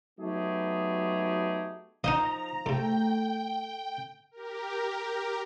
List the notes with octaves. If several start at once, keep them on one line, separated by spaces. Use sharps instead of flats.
F#3 A3 B3 D#4 G4 G#4
F3 D#4 C5 D#5 F5 F#5 A#5
G#2 C3 A3 G5
G4 A#4